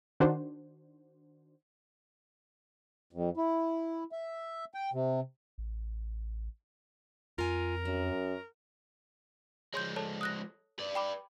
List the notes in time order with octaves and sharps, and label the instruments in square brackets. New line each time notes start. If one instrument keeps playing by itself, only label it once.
[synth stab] D#3 D4 F#4 C5
[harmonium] F2
E4
E5
G5
C3
[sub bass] A1
[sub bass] F2 [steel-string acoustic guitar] F4 G#5 [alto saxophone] A#4
[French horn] F#2 [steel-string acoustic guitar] F#4
[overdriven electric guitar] F3 G#3 [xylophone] C#5 C6 G6
[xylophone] A4 C#5 A5
D#6 F#6 A#6
[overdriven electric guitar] B4 D5
[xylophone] G5 B5 D6